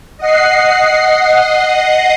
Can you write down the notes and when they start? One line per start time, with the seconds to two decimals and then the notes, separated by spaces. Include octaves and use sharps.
0.18 D#5 F#5 C7